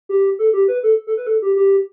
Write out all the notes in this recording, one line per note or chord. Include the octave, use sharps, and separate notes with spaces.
G4
A4
G4
B4
A4
A4
B4
A4
G4
G4